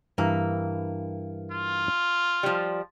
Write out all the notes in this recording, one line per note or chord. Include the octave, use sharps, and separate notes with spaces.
G2 E3 A#3 A#5
F4
F3 G3